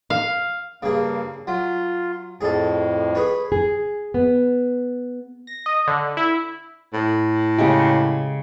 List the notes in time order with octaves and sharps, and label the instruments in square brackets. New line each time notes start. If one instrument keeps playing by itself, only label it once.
[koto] F5
[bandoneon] G2 A#3 [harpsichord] C#3 G#4
[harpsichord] F#3 [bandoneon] F4
[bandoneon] F2 A2 [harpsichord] G#4 A4
[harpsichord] G#4 B4 C#5
[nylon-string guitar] G#4
B3
[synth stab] A#6
D#5
D3
E4
[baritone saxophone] A2
[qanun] C#3 G#3 G4